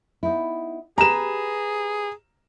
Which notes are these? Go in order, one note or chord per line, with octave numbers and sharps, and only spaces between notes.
B3 D#4 E4
G4 G#4 B4 A#5 E7